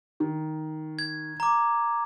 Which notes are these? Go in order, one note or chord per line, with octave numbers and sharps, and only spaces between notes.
D#3
G#6
A#5 D6